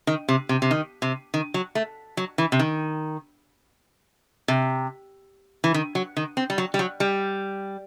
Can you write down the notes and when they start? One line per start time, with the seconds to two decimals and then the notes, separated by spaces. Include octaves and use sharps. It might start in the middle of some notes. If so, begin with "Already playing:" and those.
0.07 D#3
0.28 C3
0.49 C3
0.62 C3
0.71 D#3
1.02 C3
1.34 D#3
1.54 F#3
1.75 A3
2.17 F#3
2.38 E3
2.52 C3
2.59 D#3
4.48 C3
5.64 E3
5.74 D#3
5.95 F#3
6.17 D#3
6.37 C4
6.50 G3
6.58 F#3
6.74 G3
6.79 F#3
7.00 G3